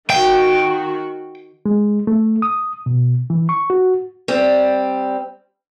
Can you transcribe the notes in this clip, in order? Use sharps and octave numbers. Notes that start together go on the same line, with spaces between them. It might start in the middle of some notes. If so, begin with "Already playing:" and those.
D#3 F#4 G5
G#3
A3
D#6
B2
E3
C#6
F#4
G3 C4